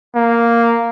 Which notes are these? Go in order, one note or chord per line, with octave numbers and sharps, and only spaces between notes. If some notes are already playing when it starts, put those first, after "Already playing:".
A#3